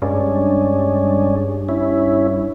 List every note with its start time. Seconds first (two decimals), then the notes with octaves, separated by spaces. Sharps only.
0.02 G2 G#3 C#4 D4
1.69 C#4 E4